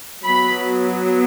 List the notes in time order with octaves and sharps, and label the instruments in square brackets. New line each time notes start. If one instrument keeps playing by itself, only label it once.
[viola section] F#3 B3 B5